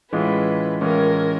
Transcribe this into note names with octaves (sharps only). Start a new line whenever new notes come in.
A2 E3 G#3 C#4 F4 B4
A2 E3 G#3 C#4 F4 A#4